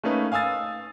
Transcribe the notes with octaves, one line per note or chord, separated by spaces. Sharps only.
A3 A#3 C#4 D#4 B4
F5 G#5 D#6 E6 A6